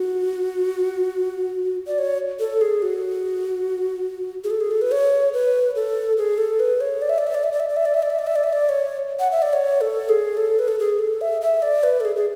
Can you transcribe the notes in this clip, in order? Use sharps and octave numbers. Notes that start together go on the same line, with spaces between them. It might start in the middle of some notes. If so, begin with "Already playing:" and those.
Already playing: F#4
D5
C#5
A4
G#4
F#4
G#4
A4
G#4
A4
B4
C#5
B4
A4
G#4
A4
B4
C#5
D5
E5
D5
E5
D5
E5
D5
E5
D5
E5
D5
E5
D5
E5
D5
E5
D5
E5
D5
C#5
F#5
E5
D5
C#5
A4
G#4
A4
B4
A4
G#4
A4
E5
E5
D5
B4
A4
G#4
G#4